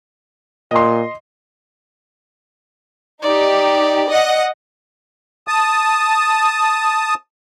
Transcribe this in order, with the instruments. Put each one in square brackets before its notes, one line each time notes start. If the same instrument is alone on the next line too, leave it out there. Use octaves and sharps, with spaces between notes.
[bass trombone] A#2 [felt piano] D#5 C6
[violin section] D#4 G4 [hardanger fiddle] D5
[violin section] D#5 F#5
[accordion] A5 D#6